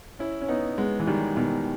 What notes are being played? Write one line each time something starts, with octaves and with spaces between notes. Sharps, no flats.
C#4 E4
C#4
B3 D#4
G#3 B3
E3
D#3 G3
B2 D#3